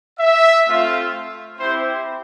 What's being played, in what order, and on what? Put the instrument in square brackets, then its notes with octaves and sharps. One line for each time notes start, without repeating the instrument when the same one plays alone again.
[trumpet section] E5
A3 C4 F4
C4 E4 G4 C5